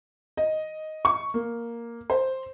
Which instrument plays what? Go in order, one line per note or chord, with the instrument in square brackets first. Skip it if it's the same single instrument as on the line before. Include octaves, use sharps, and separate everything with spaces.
[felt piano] D#5
C#6
A#3
C5